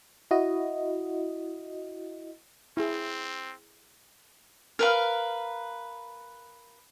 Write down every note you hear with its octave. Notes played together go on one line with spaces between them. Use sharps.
E4 F#4 D#5
C4 E4 G#4
A#4 B4 F5